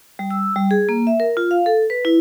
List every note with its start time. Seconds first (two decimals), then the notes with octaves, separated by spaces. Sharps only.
0.19 G3
0.31 E6
0.56 G3
0.71 G#4
0.89 A#3
1.07 E5
1.20 A#4
1.37 F4
1.51 F5
1.66 A4
1.90 B4
2.05 E4